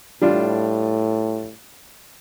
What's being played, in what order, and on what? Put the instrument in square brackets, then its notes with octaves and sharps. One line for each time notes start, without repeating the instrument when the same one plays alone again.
[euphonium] A2 [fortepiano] G3 D4 F4